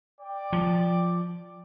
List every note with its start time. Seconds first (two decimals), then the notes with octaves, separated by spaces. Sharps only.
0.21 D5 G5 D6
0.53 F3